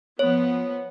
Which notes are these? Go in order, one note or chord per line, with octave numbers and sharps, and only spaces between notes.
F3 B3 C#5